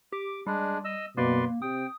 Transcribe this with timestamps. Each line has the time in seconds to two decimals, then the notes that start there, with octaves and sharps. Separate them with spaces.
0.12 G4 D6
0.47 G3 G#3 D4
0.85 D#5 E6
1.17 F#2 B2 A#3 B4 D5 C6
1.62 C3 G5 D#6